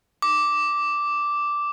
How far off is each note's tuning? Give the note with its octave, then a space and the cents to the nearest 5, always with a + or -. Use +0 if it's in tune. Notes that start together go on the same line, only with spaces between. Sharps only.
D6 -5